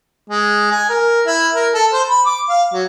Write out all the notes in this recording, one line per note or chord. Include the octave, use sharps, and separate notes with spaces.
G#3
G#5
A#4
E4
A#4
A4
C5
B5
D6
F5
F#3